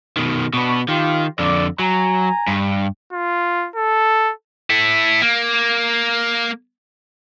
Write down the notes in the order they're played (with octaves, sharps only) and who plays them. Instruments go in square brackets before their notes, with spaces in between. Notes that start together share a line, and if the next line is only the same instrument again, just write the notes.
[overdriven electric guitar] B2 D#3
[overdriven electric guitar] B2 B3 [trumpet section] D4 B5 C#6
[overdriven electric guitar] D#3 [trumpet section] F4 G4
[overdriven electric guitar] F2 D3 [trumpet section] D5
[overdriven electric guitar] F#3 [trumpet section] G#5 A#5
[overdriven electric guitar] G2
[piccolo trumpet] F4
A4
[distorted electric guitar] E4 A4
A#3